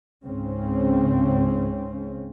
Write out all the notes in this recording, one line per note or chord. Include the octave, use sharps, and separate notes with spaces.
C#2 G#2 C#3 C4 C#4